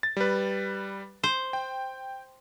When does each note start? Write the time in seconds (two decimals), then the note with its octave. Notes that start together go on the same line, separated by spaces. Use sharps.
0.03 A6
0.17 G3 B4
1.23 C5
1.53 G5